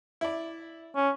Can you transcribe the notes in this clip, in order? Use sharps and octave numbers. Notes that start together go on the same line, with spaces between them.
E4 D5
C#4